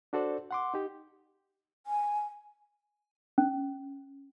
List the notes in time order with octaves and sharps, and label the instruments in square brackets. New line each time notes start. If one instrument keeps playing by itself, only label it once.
[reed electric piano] D4 F#4 A4 C5 D5
F#5 C6 D6
D#4 G4
[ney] G#5
[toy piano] C#4